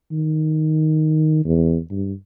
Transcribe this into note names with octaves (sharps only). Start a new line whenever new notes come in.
D#3
E2
G2